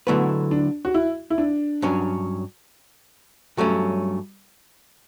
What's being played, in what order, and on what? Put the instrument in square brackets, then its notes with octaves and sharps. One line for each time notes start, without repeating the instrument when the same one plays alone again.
[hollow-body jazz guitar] D3 F#3 A3 E4 B4 [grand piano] B3
[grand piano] D4
F#4
E4
E4
D4
[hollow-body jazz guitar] G2 F#3 C#4
[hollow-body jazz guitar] G2 F#3 A3 C#4 [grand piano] G3